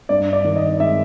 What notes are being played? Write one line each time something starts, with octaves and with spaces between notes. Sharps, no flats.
G2 D5
D5
D#3
D#5
G#3 E5